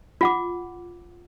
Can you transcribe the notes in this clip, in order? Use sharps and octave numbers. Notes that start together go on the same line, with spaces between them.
F4 F#5 D6